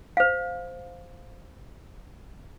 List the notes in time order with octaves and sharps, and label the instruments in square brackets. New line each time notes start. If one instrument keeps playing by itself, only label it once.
[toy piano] C5 F5